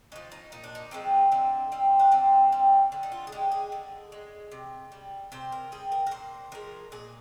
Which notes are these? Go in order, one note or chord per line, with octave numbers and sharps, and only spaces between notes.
F3 G#3 D#4
D#4
A#2 D#4
D4
D#4
F3 G#3 C4
D3 C4
G3 C4
D4
D3 C4
G3
D3
D#4
F4
G#4
G#3 G4
G#4
D3
G#3
C3
G3
C3 C5
A#4
G3 G#4
A#4
A#4
A#2 C5
F3 G#3 A#4
A#2 G#4